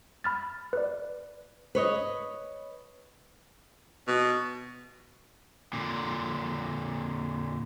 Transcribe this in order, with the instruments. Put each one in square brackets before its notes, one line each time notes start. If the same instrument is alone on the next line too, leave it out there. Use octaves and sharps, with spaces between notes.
[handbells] B5 F6 A6
B4 D5
[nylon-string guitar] B4 C#5 D#5
[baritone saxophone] B2
[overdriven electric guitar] A#2 D3